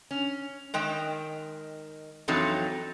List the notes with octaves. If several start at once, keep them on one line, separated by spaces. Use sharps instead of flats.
C#4
D#3 G#3 G5
F2 E3 F#3 C4 D#4 A4